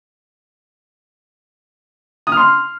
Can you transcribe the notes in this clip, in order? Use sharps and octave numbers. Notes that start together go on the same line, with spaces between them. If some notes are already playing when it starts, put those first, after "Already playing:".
D#6
F6
C6